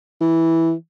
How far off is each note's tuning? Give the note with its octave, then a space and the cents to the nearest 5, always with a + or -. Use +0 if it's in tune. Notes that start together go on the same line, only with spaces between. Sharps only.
E3 -5